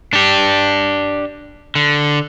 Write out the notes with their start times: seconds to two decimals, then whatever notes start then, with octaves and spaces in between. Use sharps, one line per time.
0.13 D4 G4
1.75 D3